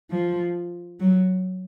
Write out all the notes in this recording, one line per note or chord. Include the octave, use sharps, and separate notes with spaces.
F3
F#3